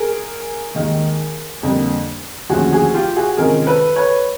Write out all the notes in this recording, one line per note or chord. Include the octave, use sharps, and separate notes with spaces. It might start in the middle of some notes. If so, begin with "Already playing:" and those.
Already playing: G#4 A#4
D#2 D#3 G#3
F2 D3 G3 A#3
D#2 D3 F3 A3 C#4 F#4 G#4
F#4 G#4
F4 G4
F#4 G#4
C3 D#3 G#3 C#4 F4 G#4 A#4
A4 B4
B4 C#5